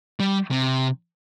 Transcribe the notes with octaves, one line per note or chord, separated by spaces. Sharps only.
G3
C3